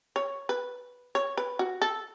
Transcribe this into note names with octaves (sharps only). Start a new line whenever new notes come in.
C#5
B4
C#5
B4
F#4
A4